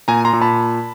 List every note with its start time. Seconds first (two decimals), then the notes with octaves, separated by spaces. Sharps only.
0.08 A#2 G#5 A#5
0.25 A#5 C6
0.33 A#2
0.42 A5 B5